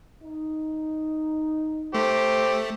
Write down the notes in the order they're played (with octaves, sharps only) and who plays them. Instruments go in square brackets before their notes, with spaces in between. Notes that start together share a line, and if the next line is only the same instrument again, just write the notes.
[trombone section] D#4
[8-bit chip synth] A3 [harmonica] G4 C5